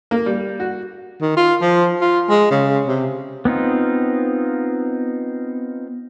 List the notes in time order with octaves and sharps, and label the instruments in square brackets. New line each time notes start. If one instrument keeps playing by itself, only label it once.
[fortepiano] A#3
G3
F#4
[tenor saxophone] D#3
F4
F3
F4
G#3
C#3
C3
[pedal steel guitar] B3 C4 D#4 F4